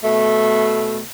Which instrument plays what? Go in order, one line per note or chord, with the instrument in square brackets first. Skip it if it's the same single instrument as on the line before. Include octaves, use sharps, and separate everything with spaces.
[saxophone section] B2 A3